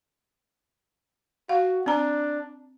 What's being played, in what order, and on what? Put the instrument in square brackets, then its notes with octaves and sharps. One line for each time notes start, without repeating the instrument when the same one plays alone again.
[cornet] F#4 [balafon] F5
[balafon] C4 A#5 [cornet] D4